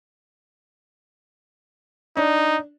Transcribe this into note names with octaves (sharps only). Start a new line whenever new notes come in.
D4 D#4